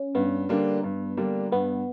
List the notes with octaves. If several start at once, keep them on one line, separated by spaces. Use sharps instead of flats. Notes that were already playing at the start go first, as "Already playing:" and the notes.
Already playing: C#4
G2 B3
D3 G3 A#3 D4
G2
D3 G3 A#3 D4
G2 B3